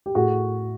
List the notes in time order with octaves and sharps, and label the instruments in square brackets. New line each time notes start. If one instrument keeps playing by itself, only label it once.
[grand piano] G4
A2 F#4 G#4